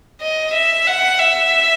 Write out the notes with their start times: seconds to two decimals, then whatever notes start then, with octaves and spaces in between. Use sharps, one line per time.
0.22 D#5
0.54 E5
0.87 F#5
1.19 E5